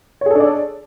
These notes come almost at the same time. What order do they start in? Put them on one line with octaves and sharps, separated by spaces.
C#5 G#4 A4 D4 D5